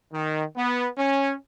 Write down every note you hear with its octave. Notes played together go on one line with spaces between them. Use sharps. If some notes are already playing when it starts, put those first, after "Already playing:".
D#3
B3
C#4